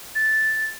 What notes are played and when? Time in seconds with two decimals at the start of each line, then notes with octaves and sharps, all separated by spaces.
0.15 A6